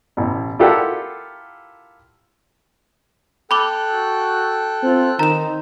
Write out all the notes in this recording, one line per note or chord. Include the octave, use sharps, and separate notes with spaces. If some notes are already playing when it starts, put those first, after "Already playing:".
A1 B2
E4 F4 G4 A4 A#4 F#5
A4 G5 B5 D6 F#6
F#4
C4 F4
D#3 C4 D#4 A#5 E7